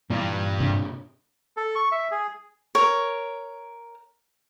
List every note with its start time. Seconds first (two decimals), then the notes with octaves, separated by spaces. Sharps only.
0.10 G2 A#2 E3 G3
0.60 C3 D4
1.57 A4
1.75 C#6
1.92 E5
2.11 G#4
2.75 A#4 C#5